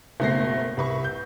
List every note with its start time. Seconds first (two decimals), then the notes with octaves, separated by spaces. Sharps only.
0.20 F#1 B2 A3 C4 A#6 C7
0.77 C2 B4 C#6
1.04 G6